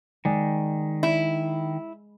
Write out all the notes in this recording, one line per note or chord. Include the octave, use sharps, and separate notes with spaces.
D#3 G#3 D5
E4